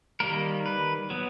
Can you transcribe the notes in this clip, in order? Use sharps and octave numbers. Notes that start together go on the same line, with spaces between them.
D#3 G3 A#3 A#4
B4
F#3 B3